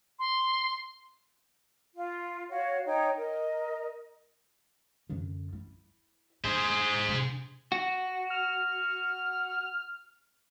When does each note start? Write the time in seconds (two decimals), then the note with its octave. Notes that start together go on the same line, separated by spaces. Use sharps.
0.19 C6
1.95 F4
2.50 F#4 C#5 F5
2.86 D#4 C#5 G5
3.17 A#4 D#5
5.09 F#2 D3
5.53 E4
6.44 D4 G#4 C5
7.08 C3 D4
7.72 F#4
8.30 F6